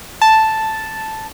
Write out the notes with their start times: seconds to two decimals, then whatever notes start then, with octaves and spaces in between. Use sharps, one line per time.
0.22 A5